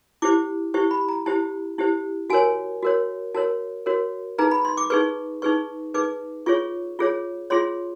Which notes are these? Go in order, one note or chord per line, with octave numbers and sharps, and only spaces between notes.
E4 G4 C5 D6
E4 G4 C5 C#6
B5
A#5
E4 G4 C5 A5
E4 G4 C5
F#4 A#4 C#5 G#5
F#4 A#4 C#5
F#4 A#4 C#5 A5
F#4 A#4 C#5
D#4 G#4 B4 A#5
B5
C6
D6
D#4 G#4 B4 C#6
D#4 G#4 B4 C#6
D#4 G#4 B4 D6
F4 G#4 C#5 C#6
F4 G#4 C#5
F4 G#4 C#5 C6